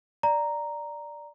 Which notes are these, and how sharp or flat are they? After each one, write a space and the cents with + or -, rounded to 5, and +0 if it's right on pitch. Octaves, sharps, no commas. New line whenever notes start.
D5 +0 A#5 +0